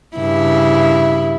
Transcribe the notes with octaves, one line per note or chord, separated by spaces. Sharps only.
G2 C#3 E4